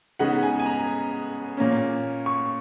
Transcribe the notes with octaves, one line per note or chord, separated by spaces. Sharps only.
C#3 G#3 B3 D#4 F#5
G#5
G#5
A#5
A#2 A#3 C#4
C#6